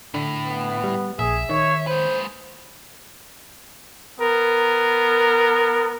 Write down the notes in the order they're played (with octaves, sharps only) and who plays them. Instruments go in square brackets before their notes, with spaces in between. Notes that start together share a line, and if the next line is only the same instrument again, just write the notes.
[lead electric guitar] A2 [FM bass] D3
[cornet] B3
[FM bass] G3
[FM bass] A#1 [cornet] G#4 [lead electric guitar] E5
[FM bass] D#3 [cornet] C#5
[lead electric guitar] G#3 B4 [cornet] C5
[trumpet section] B3 A#4